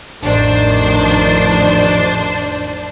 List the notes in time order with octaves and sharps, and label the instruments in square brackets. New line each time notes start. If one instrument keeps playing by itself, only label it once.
[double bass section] A1 F2 D#3 [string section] D4 C5